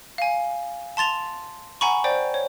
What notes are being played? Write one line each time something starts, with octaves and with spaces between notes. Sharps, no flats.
F5 G#5
A5 C6 A6 F7
F#5 G#5 A#5 B5 C#6
C5 D5 G5
C#5